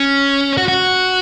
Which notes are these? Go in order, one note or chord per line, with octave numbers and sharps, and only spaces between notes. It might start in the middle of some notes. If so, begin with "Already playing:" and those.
Already playing: C#4
F#4
F#4